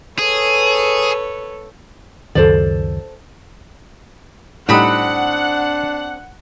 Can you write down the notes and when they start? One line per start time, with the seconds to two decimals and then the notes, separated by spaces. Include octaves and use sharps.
0.19 G#4 A4 B4 C#5
2.35 C#2 F#2 D#3 A4 C5 D5
4.69 A2 G3 C4 D4 D#4 F#5 B5 D#6